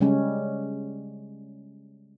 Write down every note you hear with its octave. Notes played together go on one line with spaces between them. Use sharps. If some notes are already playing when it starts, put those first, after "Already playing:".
C#3 G3 G#3 C#4